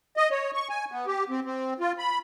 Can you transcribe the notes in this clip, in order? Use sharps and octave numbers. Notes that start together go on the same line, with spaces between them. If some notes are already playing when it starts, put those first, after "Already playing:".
D#5
C#5
C#6
G#5
B3
G4
C4
C4
F4
B5